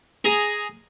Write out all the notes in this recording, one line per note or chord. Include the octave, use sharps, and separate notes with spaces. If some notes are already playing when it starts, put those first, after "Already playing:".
G#4 A#5